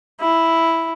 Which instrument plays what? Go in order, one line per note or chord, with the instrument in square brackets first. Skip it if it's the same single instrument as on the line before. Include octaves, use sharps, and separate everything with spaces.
[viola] E4